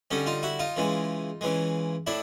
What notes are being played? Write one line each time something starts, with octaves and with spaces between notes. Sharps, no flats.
D3 G3 C#4 D#4
D#4 F4
E4 F#4
D#4 F4
C#3 E3 G#3
C#3 E3 G#3
A2 D4 E4